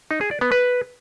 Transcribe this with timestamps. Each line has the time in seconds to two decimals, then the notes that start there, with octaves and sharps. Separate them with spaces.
0.11 D#4
0.21 G#4
0.31 D5
0.41 B3
0.52 B4